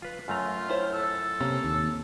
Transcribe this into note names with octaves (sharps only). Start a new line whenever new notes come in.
F4 B4
F#2 A3 F4 A#5
E4 C5 C#5
A4
C3 A#3 C#4
D#2